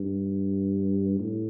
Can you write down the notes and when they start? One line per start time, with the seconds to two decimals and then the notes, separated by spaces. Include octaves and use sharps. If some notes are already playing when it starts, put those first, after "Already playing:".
Already playing: G2
1.20 A2